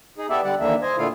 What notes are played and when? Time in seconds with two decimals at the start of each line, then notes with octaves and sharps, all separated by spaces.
0.18 D#4 G#4
0.30 B3 E4 G4 A4 D5 E5
0.44 D3 G3 D5 F#5
0.60 D#2 D3 E3 A#3 D4 E5
0.82 C5 D#5 G#5
0.98 A#2 D3 A3 E4 F4 F5